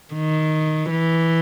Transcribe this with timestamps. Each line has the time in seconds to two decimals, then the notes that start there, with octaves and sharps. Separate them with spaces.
0.14 D#3
0.90 E3